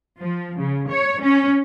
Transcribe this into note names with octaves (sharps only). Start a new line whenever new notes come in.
F3
C#3
C#5
C#4